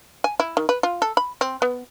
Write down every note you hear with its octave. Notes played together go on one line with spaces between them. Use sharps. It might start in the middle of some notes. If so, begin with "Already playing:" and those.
G#5
E4
D#3
B4
F4
A4
B5
C4
B3